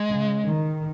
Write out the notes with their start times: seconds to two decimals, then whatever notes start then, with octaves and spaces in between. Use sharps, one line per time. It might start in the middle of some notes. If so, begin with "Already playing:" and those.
Already playing: G#3
0.10 C#3
0.44 D#3